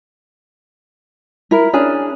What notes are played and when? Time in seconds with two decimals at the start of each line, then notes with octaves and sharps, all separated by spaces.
1.51 E4 A#4
1.73 C#4 D4 G#4